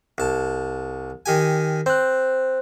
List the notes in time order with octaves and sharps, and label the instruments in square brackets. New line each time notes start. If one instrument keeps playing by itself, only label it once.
[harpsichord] C2 A5
D#3 G4 G#5
[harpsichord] C4 [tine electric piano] C5 F#6